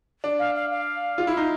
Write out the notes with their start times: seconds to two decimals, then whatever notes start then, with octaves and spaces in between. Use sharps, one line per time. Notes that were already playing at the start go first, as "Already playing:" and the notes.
0.24 D4
0.39 F5
0.55 F5
0.70 F5
1.18 F4
1.27 E4
1.37 D#4